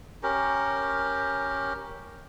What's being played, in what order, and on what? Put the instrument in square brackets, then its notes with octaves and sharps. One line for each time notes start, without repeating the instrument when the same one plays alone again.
[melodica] C#4 G4 A#4